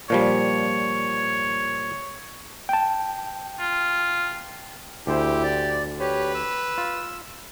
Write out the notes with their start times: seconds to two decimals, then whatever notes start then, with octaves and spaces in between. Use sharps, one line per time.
0.10 A#2 F3 G3 C#5
2.69 G5 A5
3.60 F4
5.07 D2 E4 G4 C5
5.43 D5
6.00 G4 B4 C#5
6.35 E6
6.78 F4